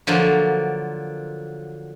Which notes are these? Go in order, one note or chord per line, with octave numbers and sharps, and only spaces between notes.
D3 F3 F#3 A#3